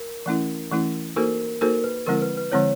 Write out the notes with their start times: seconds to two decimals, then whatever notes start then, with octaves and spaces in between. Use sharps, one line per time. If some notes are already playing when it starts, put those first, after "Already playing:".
Already playing: A#4
0.26 E3 A3 C#4 E4
0.71 E3 A3 C#4 E4
1.16 A#3 D#4 F#4 A4 A#4 C5
1.61 A#3 D#4 F#4 A4 A#4 C5
1.84 B4
2.06 D3 F3 G#3 C4 E4 A#4
2.22 B4
2.37 B4
2.52 D3 F3 G#3 C4 E4 C#5